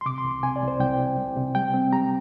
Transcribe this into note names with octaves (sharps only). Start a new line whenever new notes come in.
C6
C3 D6
C6
C2
C6
C3 G#5
D5
C2
C5
C2 G5
C3
C2
C3
G3 G5
C4
G3 A#5